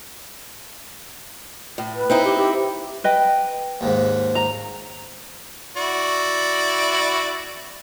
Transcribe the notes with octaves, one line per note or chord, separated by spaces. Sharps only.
A2
B4
C4 D#4 E4
G4
G4
B4 D#5 G5
D#2 G#2
A#5
E4 F#4 D5